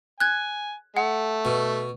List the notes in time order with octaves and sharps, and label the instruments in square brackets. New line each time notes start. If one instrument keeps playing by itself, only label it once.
[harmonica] G#5 [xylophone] F#6 G#6
[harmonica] A3 [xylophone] F#5
[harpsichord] B2